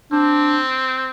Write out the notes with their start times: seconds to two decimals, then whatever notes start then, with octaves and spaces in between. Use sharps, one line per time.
0.12 C4 D4